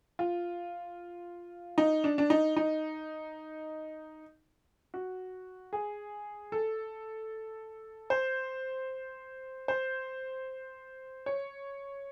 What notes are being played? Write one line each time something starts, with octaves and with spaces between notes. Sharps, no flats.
F4
D#4
D4
D4
D#4
D#4
F#4
G#4
A4
C5
C5
C#5